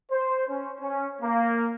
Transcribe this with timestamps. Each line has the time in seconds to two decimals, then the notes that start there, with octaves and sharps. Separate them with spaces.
0.11 C5
0.48 C#4
0.80 C#4
1.22 A#3